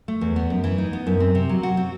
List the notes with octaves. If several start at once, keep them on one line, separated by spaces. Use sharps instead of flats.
A3
E2
B3
F#2
E3
D#4
B3
F#2
C4
C3
F#3
F#4
C4